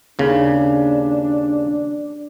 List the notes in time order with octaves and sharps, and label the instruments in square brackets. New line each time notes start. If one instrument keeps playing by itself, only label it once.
[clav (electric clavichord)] D#2 C#3 [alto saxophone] D4